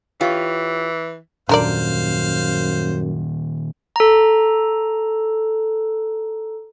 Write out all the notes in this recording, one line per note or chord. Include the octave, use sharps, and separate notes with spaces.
E3 F4 G4 C#5
F#2 A#2 D3 D#3 A#4 C5 D5 F5
A4 A#5